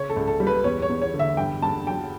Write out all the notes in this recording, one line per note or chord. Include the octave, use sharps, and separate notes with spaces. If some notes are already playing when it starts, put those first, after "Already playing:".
Already playing: C#3 C#5
A4
C#2
A4
G3
B4
E2 C#5
C#5
E2
C#5
D3
E5
G2 G5
G2 A5
F#3 G5